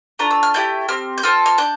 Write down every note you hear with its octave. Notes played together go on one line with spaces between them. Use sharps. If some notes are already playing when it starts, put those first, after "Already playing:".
A3 D4 F4 A#5
E6
F6
A3 E4 G4 G6
C4 G4 F6
G6
C4 F4 A4 F6
F6
D4 G6